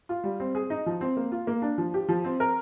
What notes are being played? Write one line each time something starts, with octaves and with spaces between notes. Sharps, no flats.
F4
G3
C4
G#4
D#4
F3
C4
A#3
F4
A#3
D4
F3
G4
F3
C4
A#4